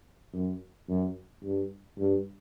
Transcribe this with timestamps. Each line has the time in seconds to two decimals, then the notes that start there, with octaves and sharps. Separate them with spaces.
0.34 F#2
0.89 F#2
1.43 G2
1.98 G2